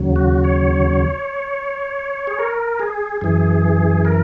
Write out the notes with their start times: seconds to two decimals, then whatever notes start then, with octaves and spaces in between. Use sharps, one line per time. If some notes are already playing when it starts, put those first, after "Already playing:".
Already playing: D#2 C#3 F#3
0.16 F#4
0.44 C#5
2.27 G#4
2.39 A#4
2.80 G#4
3.21 F#2 E3 G#4
4.05 A#4